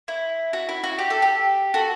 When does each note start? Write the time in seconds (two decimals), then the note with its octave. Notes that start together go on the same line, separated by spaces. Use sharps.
0.08 E4
0.53 F#4
0.69 E4
0.84 F#4
0.98 G4
1.10 A4
1.22 G4
1.74 F#4 A4